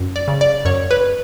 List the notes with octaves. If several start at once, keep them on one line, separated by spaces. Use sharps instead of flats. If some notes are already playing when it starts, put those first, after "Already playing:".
Already playing: F#2
D5
C#3
D5
F#2 C#5
B4